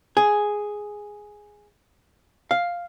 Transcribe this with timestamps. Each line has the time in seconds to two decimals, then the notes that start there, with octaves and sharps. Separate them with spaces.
0.17 G#4
2.51 F5